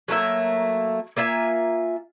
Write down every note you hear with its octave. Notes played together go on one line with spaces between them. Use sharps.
F#3 A3 A#3 E5
A#3 F4 E5 G#5